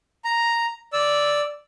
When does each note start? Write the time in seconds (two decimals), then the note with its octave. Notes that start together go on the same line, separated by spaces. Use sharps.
0.24 A#5
0.93 D5 E6